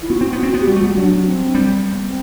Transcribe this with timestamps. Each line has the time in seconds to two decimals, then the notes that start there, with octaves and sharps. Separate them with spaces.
0.02 E4
0.10 B3 F#4
0.21 C4
0.33 B3
0.43 C4
0.54 B3
0.61 G4
0.67 G3 F#4
0.76 A3
0.82 G3 F#4
0.97 F#3 D4
1.26 C4
1.55 G3
1.82 C4
1.93 B3
2.03 C4